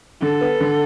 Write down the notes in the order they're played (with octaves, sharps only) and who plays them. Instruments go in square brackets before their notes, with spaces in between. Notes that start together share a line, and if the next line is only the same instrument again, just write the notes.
[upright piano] D3 [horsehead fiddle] A4
[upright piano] B3
D3